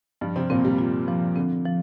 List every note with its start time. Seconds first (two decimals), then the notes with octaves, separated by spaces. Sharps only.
0.21 G2 F3 G3
0.36 C3 C4
0.50 A#2 A#3 C4
0.64 G2 G3
0.78 F4
1.08 F3
1.36 D3 C4
1.65 F3